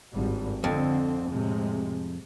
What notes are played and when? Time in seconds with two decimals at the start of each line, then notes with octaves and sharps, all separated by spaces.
0.13 G#1 G2 G3
0.64 F2 D3 C4
1.30 A2 C3 G#3